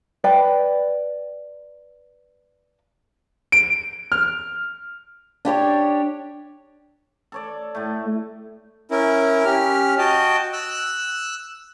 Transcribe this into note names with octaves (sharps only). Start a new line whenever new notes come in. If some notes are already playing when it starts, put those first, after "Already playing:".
B4 D5 G5
D7
F6
D4 G4 C#5 D5
A4 C#5 D5
A2 A3
C#4 E4 A#4
C#4 G4 F6
F#4 D#5 G5 A5
E6 F#6